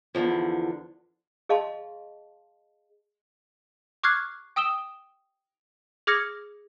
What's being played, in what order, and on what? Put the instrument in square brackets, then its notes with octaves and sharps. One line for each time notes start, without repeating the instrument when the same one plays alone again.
[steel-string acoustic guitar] E2 A#2 D3 F3
[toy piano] G#4 D#5 F5 A5 C6
[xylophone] C#6 D6 F6 F#6 G#6 C7
G5 D#6 E6 E7 G7
G#4 D6 F6 G#6 A#6 C#7